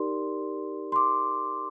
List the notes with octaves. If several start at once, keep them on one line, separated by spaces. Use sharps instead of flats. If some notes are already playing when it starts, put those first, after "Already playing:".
Already playing: D#4 G4 A#4 D5 C6
C6
D6